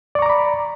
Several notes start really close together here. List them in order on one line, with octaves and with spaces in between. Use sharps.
D5 C#6 A#5 D6 B5